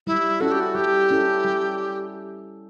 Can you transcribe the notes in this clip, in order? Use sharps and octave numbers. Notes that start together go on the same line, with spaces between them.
G3 E4
C#4 E4 F#4 A4
G4
F#4
G3 G4
C#4 E4 A4
G3